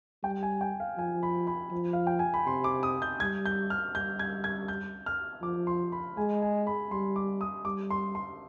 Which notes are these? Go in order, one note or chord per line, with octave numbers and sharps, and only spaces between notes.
G3 G5
G#5
G5
F5
F3 G#5
B5
B5
F3
F5
G5
G#5
B5
C3 C6
D6
D#6
G6
G3 G#6
G6
F6
G3 G6
G#6
G#6
G6
F6
F3 D6
C6
B5
G#3 G#5
G#5
B5
G3 C6
D6
D#6
G3 D6
C6
C6